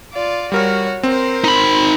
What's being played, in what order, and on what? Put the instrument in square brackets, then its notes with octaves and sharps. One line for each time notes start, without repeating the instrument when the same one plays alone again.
[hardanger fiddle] F4 D5
[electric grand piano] G3 A#4 F6 [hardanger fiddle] F#4 C#5
[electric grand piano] C4 [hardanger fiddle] A#4 C5
[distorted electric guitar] D#4 B5